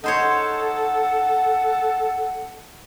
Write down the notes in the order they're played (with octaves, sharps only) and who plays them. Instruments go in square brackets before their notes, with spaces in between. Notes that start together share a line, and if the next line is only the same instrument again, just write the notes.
[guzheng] D#4 C5 C#5 [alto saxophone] A4 [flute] F#5